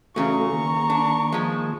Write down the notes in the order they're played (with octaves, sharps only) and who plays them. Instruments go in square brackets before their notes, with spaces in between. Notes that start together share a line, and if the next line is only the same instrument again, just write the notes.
[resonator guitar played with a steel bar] E2 C#3 [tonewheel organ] A3 F#4 A4 [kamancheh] A#5 C#6
[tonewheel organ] D#3 A#3
[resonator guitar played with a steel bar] D4
F3 G#3